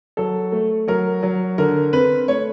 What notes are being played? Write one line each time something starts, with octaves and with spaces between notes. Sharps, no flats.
F#3 A4
A3
F#3 A#4
F#3
D3 A#4
C4 B4
A3 C#5